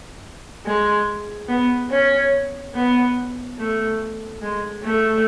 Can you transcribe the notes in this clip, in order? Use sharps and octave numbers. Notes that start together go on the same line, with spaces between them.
G#3
B3
C#4
B3
A3
G#3
A3